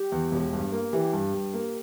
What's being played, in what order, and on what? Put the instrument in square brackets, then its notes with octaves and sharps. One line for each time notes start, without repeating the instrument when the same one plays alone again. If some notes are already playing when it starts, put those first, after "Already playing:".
Already playing: [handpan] G4
[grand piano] E2
E1
G2
A#3
[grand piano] E3 [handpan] G4
[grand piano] G2
G2
A#3